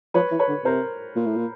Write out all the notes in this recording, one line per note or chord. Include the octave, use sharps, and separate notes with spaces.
F3 B4 C#5
E3
B4 C#5
D3
C3 A#4 C5
A#2
A2
A#2